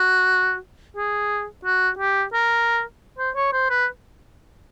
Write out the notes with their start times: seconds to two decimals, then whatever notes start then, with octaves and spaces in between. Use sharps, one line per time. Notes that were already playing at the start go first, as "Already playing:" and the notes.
Already playing: F#4
0.97 G#4
1.65 F#4
1.99 G4
2.33 A#4
3.18 C5
3.36 C#5
3.53 C5
3.70 B4